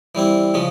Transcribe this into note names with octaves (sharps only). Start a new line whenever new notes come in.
E3 G3 C4 E4
C#3 F3 G#3 C#4